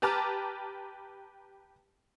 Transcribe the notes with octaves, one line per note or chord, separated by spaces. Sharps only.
G4 B4 A5 A#5 D6 F6